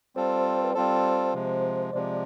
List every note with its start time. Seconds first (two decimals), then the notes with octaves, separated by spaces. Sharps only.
0.16 G3 C4 F4 A4 C5
0.64 B4
0.74 G3 C4 F4 A4 C5
1.34 C3 F3 G#3
1.93 C3 F3 G#3 D5